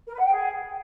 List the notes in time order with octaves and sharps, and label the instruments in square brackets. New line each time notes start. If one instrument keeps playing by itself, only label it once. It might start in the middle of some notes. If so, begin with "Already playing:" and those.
[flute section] A#4
B4
F#5
G5
G#4